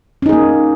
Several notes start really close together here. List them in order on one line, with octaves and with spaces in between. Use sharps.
C#4 D#4 G#4 A#3